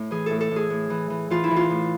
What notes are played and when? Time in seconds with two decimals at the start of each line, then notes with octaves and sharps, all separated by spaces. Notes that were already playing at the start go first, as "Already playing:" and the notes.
Already playing: A2
0.11 E3 G#4
0.26 A2 A4
0.41 A4
0.51 A2 G#4
0.70 A2
0.90 E3
1.10 E3
1.30 E3 F4
1.44 E4
1.51 E3
1.56 F4
1.70 A2